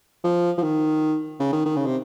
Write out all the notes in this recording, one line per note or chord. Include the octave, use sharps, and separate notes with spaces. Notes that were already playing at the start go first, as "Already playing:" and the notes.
F3
F3
D#3
C#3
D#3
D#3
C#3
C3